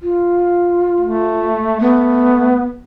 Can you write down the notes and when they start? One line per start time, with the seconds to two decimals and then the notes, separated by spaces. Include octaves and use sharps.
0.01 F4
1.01 A3
1.80 A3 B3